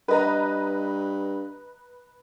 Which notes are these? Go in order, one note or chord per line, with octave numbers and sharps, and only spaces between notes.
G2 B4 D#5 A#5